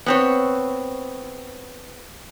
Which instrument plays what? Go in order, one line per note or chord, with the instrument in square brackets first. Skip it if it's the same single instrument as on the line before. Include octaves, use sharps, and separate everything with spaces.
[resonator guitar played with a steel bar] B3 C4 C#5